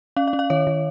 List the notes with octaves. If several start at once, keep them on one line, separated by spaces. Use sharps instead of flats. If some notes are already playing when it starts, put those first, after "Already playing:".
C#4 F5
F5
C#4
F5
D#3 C#5
D#3